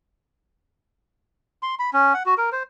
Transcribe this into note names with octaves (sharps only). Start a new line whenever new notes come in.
C6
B5
C#4
F#5
F#4
A#4
C5